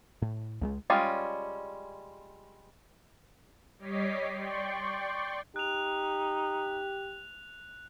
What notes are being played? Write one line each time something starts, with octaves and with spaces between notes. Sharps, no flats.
A2
C#2 F#3 G#3
G3 G#3 C#4 F4
G3 C#5 D#5 D6 B6 C7
D5 G5 C6 C#6
D#4 G4 F#6 F7